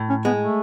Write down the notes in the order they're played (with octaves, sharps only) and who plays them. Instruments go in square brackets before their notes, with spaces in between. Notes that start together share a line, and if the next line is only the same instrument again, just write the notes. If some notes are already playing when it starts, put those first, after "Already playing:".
Already playing: [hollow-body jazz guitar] A2
[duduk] C#4
[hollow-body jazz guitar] G#3 [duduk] B3
[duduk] A3